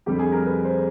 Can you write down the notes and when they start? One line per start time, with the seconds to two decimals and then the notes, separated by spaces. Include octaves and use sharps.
0.06 F2 D3 G3 G4
0.19 G#4
0.32 A#4
0.45 B4
0.65 C5